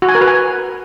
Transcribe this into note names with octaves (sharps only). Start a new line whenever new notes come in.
F#4
G#5
A#4
B4
G#5